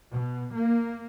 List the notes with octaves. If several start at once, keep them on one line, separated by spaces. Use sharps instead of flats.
B2
A#3